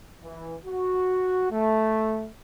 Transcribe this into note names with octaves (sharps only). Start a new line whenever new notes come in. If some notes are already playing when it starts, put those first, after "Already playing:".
E3
F#4
A3